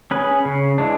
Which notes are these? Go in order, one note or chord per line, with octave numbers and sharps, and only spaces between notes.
C#4 G#4 B4
C#3
E3 G#3 D4